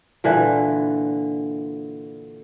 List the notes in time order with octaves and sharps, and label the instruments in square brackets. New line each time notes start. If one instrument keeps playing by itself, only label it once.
[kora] A#2 D3 E3